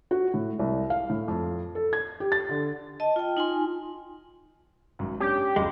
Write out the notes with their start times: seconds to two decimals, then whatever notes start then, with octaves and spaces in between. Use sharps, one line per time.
0.11 F#4
0.34 A2
0.59 C2
0.90 F5
1.10 A2
1.28 F2
1.75 A4
1.93 G#6
2.20 G4
2.32 A6
2.49 D3
3.00 D#5 A5
3.16 F4 G5
3.37 D#4 F4 G#5 C6
4.99 G#1 F#2
5.20 C#4 D4 G4
5.56 E1 C#2 F#2 G#3